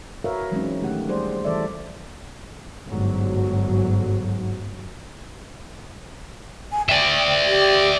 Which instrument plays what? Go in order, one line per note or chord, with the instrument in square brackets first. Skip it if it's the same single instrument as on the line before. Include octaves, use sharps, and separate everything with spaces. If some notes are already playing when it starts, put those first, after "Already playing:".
[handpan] F#4 A#4 B4 C#5 E5 F5
E3 F#3 G#3 C4 C#4 D#4
D#3 A3 G4 F#5
G3 G#4 C5 D5
E3 G3 A4 C5 D5 E5
[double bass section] G1 G#2 F#3
[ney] G#5
[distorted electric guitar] D5 E5 [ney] G5
[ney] G4